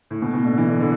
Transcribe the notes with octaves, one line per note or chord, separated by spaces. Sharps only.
A2
B2
B2
D3
E3
D3
D3